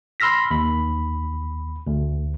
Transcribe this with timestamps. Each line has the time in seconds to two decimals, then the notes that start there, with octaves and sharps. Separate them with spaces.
0.20 B5 C6 E6 F6 A#6 B6
0.51 D#2 B5
1.87 D2